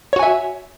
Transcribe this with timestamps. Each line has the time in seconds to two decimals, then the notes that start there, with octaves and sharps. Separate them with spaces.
0.13 C#5
0.16 F#4
0.19 G#5
0.23 E5